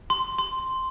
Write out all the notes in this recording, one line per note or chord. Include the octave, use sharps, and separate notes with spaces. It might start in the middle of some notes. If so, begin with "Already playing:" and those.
C6
C6